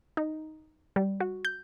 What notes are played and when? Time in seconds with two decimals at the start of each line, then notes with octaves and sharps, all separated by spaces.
0.17 D#4
0.96 G3
1.20 F#4
1.45 G6